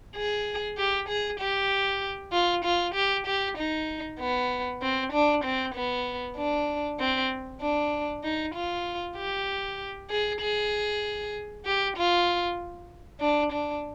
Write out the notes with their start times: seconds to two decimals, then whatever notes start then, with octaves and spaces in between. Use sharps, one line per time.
0.16 G#4
0.77 G4
1.08 G#4
1.40 G4
2.32 F4
2.64 F4
2.95 G4
3.27 G4
3.57 D#4
4.19 B3
4.82 C4
5.12 D4
5.44 C4
5.74 B3
6.37 D4
6.99 C4
7.61 D4
8.23 D#4
8.55 F4
9.17 G4
10.10 G#4
10.41 G#4
11.66 G4
11.97 F4
13.21 D4
13.52 D4